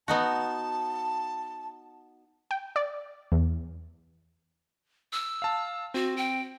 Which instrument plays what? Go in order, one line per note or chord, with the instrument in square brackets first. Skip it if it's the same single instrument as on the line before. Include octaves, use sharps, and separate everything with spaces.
[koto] B3 D#4 F#4 [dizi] A5
[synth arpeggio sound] G5
D5
E2
[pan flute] E6
[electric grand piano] F5 A5
[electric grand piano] C4 [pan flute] F#4
[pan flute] G5